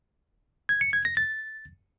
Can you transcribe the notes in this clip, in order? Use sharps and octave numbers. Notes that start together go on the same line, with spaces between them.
G#6
C#7
G#6
A#6
A6